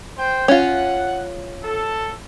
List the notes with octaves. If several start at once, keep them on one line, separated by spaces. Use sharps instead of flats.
C5 G5
C#4 F4 F#5
A4